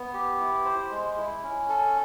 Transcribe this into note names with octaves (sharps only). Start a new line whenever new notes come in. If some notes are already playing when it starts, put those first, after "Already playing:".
Already playing: B3
G4
E4
C5
G#3
E4
C#4
A4